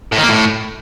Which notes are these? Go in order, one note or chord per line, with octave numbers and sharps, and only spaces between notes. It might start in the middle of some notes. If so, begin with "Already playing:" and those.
A2
D#3
A#3
A2